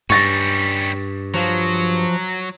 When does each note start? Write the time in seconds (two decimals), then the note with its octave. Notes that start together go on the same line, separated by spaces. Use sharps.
0.10 G2 G3 C#4 C#6 A6 A#6
1.34 F3 F#3